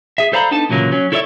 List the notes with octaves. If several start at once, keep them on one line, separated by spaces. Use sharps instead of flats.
G#4 E5
A4 C5 D5 F5 A#5 B5
B3 D4 D#4 A4 A5
C2 A#2 C#3 E3 F#3 A#3
F#3 C#4
E4 A4 C#5 D5 E5